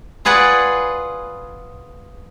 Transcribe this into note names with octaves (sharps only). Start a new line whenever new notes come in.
F4 G#4 B4 D5 F#5